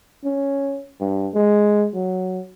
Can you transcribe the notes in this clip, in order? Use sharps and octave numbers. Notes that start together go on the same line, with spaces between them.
C#4
G2
G#3
F#3